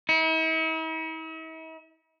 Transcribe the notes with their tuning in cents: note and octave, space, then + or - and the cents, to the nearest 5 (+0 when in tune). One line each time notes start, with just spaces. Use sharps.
E4 -45